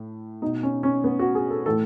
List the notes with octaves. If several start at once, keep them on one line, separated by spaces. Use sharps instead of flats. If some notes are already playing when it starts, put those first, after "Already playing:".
Already playing: A2
B2 D#4
C#4
C#4
B3
F#4
G#4
A4
A2 E3 A4